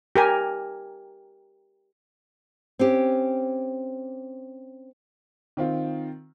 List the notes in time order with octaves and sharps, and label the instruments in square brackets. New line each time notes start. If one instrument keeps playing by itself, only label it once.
[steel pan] G4 A#4 G#5
[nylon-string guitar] C4 C#4 G4
[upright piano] D#3 C4 F4